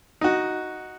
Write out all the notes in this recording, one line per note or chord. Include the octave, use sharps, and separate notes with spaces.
D#4 F#4